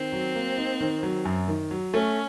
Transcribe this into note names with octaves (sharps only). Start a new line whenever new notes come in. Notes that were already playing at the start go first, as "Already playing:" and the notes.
Already playing: D#3 C4
F#3
A#3
D#4
D#3
F#3
F#2
D#3
F#3
A3 C#4